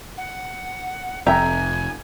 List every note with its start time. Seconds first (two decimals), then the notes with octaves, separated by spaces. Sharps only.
0.17 F#5
1.26 F1 F2 E5 G5 G#5 A#5